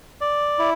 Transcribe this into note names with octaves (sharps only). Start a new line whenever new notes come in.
D5
E4